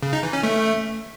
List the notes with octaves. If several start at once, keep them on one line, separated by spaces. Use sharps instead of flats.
C#3
D#4
E3
C#4
A3